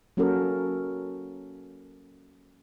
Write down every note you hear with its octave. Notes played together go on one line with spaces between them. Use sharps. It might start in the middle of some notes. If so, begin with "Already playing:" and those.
F#3 A#3 C#4 F#4 A4 A#4